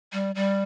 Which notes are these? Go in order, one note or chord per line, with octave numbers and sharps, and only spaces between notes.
G3
G3